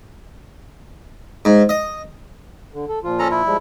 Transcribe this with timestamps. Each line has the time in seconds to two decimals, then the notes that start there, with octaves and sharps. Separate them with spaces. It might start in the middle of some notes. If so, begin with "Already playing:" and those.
1.45 G#2
1.69 D#5
2.74 D3
2.89 A4
3.04 A#2 F3 F4
3.19 C#4 A4 A#5
3.31 E4
3.45 F3 G3 G#3